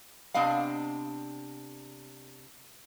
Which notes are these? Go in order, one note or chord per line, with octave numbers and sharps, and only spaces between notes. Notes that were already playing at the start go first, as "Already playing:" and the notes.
C3 B3 D4 D#5 F5